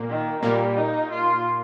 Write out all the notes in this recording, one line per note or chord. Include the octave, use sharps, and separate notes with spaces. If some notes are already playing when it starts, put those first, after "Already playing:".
Already playing: A#2 A#3
D#3
A#2 G3 A#3
D#4
F4